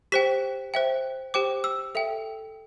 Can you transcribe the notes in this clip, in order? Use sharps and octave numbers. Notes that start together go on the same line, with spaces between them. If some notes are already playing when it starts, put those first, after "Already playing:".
G4 C5 G5 B6
C5 E5 G5
G4 C5 G5 D6
E6
A4 E5 G5